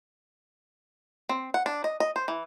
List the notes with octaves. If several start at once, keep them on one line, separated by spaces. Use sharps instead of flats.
C4
F#5
D4
D#5
D#5
C5
E3